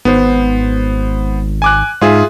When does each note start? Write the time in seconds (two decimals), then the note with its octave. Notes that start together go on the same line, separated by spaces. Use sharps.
0.05 G#1 B3 C5
1.62 G#5 D6 F#6
2.01 G#2 F4 G#4 E5